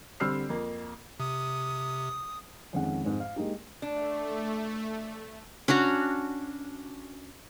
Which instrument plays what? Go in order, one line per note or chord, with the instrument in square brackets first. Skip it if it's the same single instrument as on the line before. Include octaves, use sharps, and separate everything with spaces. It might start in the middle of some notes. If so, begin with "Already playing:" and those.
[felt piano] D3 G3 C4 E6 F6 C7
F2 A#3
[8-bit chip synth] C3 [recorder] D#6
[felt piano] F2 D#3 G#3 C#4 F#5
F2 G#2
F5
G#3 A#3 D#4 G4
[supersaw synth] A3 [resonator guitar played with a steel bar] D4
[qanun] C#4 D4 F#4 A#5